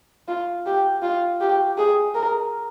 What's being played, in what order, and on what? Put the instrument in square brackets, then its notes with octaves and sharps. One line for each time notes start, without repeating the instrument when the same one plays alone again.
[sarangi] F4
G4
F4
G4
G#4
A#4